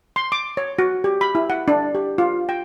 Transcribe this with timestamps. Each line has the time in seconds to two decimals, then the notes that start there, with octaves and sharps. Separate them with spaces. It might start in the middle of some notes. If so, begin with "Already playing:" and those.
0.16 C6
0.32 D6
0.57 C#5
0.79 F#4
1.04 G4
1.21 B5
1.35 E4
1.50 F#5
1.68 D4
1.95 G4
2.18 F4
2.49 G5